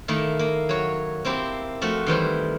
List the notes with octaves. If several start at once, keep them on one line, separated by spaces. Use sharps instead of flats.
D#3 A3 A#3 E4
A#3
F#3 C#5
A#3 C4 E4 G4
F3 A3 F#4 F#5
D#3 E3 G3 C5